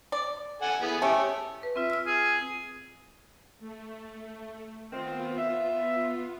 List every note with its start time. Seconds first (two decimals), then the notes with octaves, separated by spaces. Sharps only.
0.12 D5
0.62 A4 F#5 G#5
0.82 E3 B3 G#4
1.02 A3 C#4 G4
1.63 B4
1.76 C4 F4 E5
1.90 E6 F6
2.07 G#4
3.60 A3
4.91 D#3 B3 C4 F4
5.38 E5